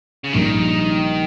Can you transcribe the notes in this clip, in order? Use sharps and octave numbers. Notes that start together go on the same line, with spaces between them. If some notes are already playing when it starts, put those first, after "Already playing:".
C#3
A#1 A#2 D#3 G3 A#3